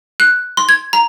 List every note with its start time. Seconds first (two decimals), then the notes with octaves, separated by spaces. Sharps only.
0.20 F#6
0.57 C6
0.69 G#6
0.93 A#5